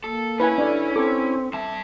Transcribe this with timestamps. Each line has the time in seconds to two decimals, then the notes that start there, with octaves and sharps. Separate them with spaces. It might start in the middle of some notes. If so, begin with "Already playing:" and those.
0.04 A#3 A4
0.40 C#4 E4 B4 G#5
0.58 D4 A4 B4 D5
0.96 C4 A4 D6
1.54 G2 E5 A5